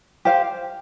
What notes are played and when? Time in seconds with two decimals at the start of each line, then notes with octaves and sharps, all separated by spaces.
0.25 G4 C5 F5